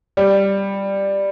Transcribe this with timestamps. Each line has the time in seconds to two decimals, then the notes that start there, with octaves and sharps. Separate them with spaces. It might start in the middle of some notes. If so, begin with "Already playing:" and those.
0.17 G3